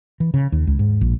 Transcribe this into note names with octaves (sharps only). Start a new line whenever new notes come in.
E3
C#3
D#2
C#2
G#2
A#1